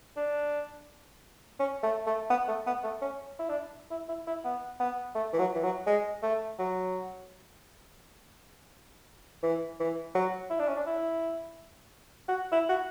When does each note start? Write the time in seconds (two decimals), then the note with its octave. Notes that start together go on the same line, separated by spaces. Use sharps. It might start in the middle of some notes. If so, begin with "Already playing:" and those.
0.17 D4
1.59 C#4
1.83 A3
2.06 A3
2.30 B3
2.48 A3
2.66 B3
2.84 A3
3.01 C#4
3.39 E4
3.49 D4
3.91 E4
4.09 E4
4.27 E4
4.45 B3
4.80 B3
5.15 A3
5.33 E3
5.39 F#3
5.55 E3
5.63 F#3
5.86 G#3
6.22 A3
6.59 F#3
9.43 E3
9.80 E3
10.15 F#3
10.50 E4
10.59 D4
10.68 C#4
10.76 D4
10.86 E4
12.28 F#4
12.52 E4
12.69 F#4